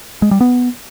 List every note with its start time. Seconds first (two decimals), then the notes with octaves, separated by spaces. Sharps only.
0.22 G#3
0.31 G3
0.41 B3